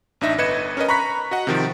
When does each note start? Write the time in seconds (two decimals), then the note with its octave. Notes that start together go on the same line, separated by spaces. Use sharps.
0.21 A1 D4 D#4 E5 A#6
0.38 G1 B4 D#5 G#6 C#7 E7
0.77 C#4 A#4 B4 D#5
0.89 A#5 B5 C#6 F#6 B6
1.31 F#4 D#5 F#5
1.47 C3 D#3 F3